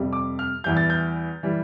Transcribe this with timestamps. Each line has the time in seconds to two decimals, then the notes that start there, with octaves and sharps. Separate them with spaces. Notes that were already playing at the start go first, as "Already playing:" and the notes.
Already playing: F2 C3 G3
0.13 D6
0.39 F6
0.64 E2 E3 G3 G6
0.77 A6
0.90 G6
1.43 E3 G3